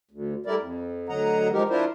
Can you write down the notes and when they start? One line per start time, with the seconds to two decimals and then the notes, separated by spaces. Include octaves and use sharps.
0.11 D2
0.46 G3 A3 E4 A#4 D5
0.59 F2
1.09 D2 D3 F#3 D#5 F#5 A#5
1.53 F3 G#3 D#4 G4 A#4
1.70 D4 E4 F4 A#4 C5